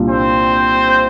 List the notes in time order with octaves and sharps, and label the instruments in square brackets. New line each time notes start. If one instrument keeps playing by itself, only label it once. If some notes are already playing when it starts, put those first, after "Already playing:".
Already playing: [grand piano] C2 A#2 G3 D4 F4
[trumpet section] C4 C5